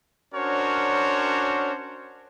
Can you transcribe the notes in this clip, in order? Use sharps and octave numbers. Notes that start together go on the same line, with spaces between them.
C#4 D4 F#4 A#4 C5 C#5